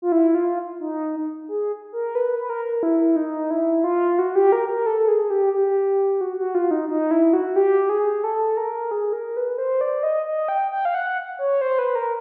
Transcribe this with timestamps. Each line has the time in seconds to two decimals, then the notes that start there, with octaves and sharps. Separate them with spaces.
0.02 F4
0.12 E4
0.35 F4
0.80 D#4
1.48 G#4
1.93 A#4
2.15 B4
2.39 B4
2.50 A#4
2.83 E4
3.16 D#4
3.50 E4
3.84 F4
4.19 F#4
4.36 G4
4.52 A#4
4.69 A#4
4.86 A4
5.08 G#4
5.30 G4
5.53 G4
6.21 F#4
6.37 F#4
6.55 F4
6.71 D#4
6.89 D#4
7.11 E4
7.33 F#4
7.56 G4
7.89 G#4
8.24 A4
8.57 A#4
8.91 G#4
9.13 A#4
9.37 B4
9.58 C5
9.81 D5
10.03 D#5
10.26 D#5
10.49 G5
10.72 G5
10.85 F5
10.94 F#5
11.38 C#5
11.61 C5
11.79 B4
11.95 A#4